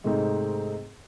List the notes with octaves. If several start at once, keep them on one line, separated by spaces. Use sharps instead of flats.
G#2 C3 G#3 A3 C4 D#4